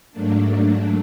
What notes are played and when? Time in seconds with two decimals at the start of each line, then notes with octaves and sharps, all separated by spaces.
0.12 G#2 F#3 A3 A#3 D4